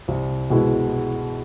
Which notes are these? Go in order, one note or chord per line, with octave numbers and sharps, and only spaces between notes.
C2
B2 G#3 B3 E4